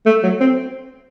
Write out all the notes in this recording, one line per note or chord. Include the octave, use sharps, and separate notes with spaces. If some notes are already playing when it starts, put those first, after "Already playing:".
A3
F#3
C4